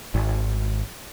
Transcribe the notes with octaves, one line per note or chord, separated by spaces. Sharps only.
G#1